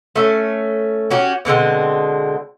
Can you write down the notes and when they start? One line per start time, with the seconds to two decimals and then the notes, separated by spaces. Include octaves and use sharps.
0.16 A3 C#4
1.11 C#4 F#4 G4
1.45 B2 D3 G#3 C4